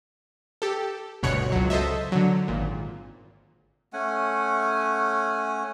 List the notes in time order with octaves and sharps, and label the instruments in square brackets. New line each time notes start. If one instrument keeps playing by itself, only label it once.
[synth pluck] G4 A4
G1 D2 B2 C#5 F#6 C#7
C#2 F#3
A4 C5 D#5 E5
D3 F#3
G#1 A#2
[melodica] A3 C#4 F#5 G#5